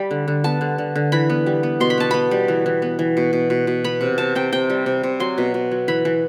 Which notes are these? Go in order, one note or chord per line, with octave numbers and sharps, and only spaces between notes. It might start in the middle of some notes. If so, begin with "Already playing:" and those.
Already playing: G3 B5
D3
D3
B3 A5
D3
D3
D3
E3 B5
B3
G3
B3
B2 C6
B5
B3 A5
B3 B5
G3
E3
E3
B3
E3
B2
B2
B2
B2
B3 B5
C3
C3 A5
C3 G5
C3 G5
G3
C3
C3
F#3 C6
B2
B2
F#3
E3 B5
E3